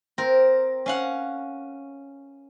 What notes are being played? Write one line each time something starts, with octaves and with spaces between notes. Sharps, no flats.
C4 A#4
C#4 F5 F#5